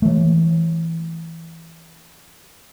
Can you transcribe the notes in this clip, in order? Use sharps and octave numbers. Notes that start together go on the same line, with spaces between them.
E3 A3